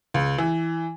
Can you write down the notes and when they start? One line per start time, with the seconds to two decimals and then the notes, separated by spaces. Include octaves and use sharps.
0.14 C#2
0.38 E3